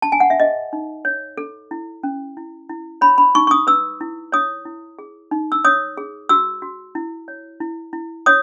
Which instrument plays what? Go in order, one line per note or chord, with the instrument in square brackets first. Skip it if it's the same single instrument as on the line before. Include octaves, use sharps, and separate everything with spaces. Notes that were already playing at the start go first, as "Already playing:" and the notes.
[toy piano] A5
G#5
F#5
E5
G#4 D#5
D#4
C#5
A4
E4
C#4
E4
E4
C#5 B5
B5
D#4 C#6
C#6
D#6
B4 E6
E4
C#5 D#6
E4
G#4
D#4
E6
C#5 D#6
G#4
F#4 E6
F#4
E4
C#5
E4
E4
C#5 D#6